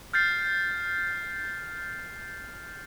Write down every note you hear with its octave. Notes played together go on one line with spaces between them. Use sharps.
F6 G6 A6 C7